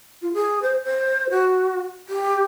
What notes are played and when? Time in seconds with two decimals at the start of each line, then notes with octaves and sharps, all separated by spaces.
0.22 F4
0.34 G#4
0.62 C5
0.84 C5
1.31 F#4
2.08 G4